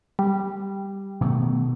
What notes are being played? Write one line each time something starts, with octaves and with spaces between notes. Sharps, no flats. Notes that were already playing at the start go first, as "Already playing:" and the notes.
G3
B2 D#3 A3